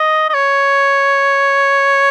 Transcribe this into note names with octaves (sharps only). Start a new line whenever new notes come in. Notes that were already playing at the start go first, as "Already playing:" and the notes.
Already playing: D#5
D#5
C#5